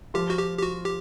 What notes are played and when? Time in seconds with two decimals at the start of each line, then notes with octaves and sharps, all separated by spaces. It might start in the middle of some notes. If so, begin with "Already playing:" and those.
0.14 F3 F4 G4
0.30 F#4
0.38 G4
0.58 G4
0.62 F#4
0.85 G4